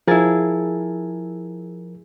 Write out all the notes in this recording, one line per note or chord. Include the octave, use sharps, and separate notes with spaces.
F3 E4 G#4 A#4 A6